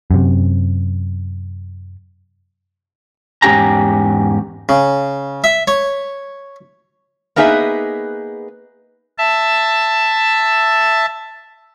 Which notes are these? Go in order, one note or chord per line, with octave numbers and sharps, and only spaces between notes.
F#2 C3
E2 G#2 C#4 G4 G#5 A#5
C#3
E5
C#5
A#3 B3 D#4 G#4 B4 E5
E5 A5